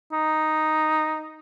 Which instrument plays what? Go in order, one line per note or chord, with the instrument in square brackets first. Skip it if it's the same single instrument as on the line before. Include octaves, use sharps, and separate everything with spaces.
[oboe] D#4